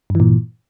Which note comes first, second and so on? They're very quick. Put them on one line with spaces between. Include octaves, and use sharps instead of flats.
G2 E3 A#2